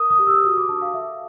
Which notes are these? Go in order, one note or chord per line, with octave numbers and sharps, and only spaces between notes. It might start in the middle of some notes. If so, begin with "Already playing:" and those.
Already playing: A#4 D#6
D#6
G4
E6
F#4 D#6
D6
D4 A5
F5
A4 E5